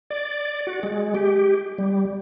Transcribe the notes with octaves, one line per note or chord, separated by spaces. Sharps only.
D5
F#4
G#3
G4
G3